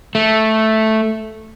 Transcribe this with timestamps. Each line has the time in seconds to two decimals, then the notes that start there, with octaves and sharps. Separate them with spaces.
0.15 A3